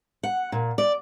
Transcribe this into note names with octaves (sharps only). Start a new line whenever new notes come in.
F#5
A#2
D5